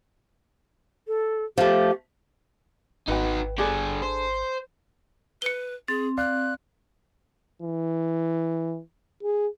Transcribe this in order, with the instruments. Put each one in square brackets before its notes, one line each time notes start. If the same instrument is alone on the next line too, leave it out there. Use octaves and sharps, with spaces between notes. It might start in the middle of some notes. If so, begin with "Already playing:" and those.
[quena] A4
[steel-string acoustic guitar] F3 A3 [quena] G4
[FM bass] G#1 [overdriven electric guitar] D#4 F#4 [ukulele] B4 G5
[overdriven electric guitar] D3 G3 [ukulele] D4 G#4 A4
[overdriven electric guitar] C5
[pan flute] B4 [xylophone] C#7 G7
[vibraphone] C4 [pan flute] G#4 [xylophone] A6
[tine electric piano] D5 F5 [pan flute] F#6
[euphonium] E3
G#4